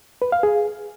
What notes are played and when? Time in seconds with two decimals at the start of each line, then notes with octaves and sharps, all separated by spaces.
0.22 B4
0.32 F5
0.43 G#4